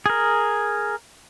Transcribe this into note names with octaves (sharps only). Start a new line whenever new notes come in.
G#4 A#4